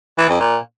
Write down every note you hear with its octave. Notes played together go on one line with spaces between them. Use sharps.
E3
F2
A#2